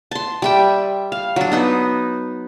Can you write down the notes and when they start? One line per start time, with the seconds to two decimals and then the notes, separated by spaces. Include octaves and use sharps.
0.11 A5 C6
0.42 G3 E5 G5
1.12 F5
1.36 F#3 D4
1.52 B3 D#4 B4